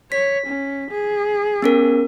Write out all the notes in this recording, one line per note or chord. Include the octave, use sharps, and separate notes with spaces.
C#5 B6
C#4
G#4
B3 C#4 A#4